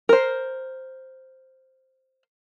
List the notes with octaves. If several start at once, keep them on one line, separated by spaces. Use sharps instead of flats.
A#4 C5